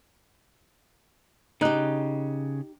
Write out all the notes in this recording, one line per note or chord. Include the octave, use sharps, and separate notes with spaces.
C#3 D#4 G4 F#6